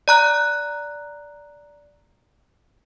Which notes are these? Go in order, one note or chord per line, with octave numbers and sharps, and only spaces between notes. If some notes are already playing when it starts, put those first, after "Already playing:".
D5 A#5 F#6